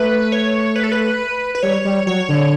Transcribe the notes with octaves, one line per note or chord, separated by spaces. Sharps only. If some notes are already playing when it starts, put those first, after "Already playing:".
Already playing: A3 B4
C#5
B4
A4
B4
B4
G3 C#5
G3
F#3 C#5
D3